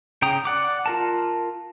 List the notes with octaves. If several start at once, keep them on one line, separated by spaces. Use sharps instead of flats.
C#3 G5 A#5 D#6
D5 F#5 D6
F4 A#4 A5